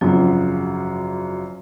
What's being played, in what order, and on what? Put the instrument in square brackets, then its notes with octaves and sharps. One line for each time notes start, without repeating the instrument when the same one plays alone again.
[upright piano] G#1 F#2 C#3 F3 [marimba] F#3